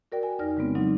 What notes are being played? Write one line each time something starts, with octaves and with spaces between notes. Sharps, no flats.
F#4 A#4 D5 G5
G#5
F2 D#4 D5 G#5 F6 A#6
C#3 G3 G#3 B3 C4
F#3 C4 D4 D#4